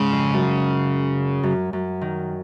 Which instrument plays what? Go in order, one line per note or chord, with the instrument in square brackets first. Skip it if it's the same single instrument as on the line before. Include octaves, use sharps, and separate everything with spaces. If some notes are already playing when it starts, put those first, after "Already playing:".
Already playing: [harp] G#2 [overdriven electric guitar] C#3
[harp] F2
F#2
F#2
F#2
D#3